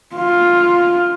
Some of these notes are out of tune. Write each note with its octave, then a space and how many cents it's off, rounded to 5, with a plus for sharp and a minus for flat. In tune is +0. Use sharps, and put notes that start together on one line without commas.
F4 +5